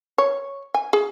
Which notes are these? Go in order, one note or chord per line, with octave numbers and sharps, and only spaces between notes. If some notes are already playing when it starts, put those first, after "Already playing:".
C#5
G#5
G#4